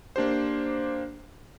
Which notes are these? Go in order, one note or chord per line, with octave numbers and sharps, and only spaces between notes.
A#3 D4 G4 C5